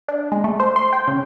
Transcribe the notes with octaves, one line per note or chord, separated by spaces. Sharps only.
D4
G#3
A3
C5
C6
G5
C#3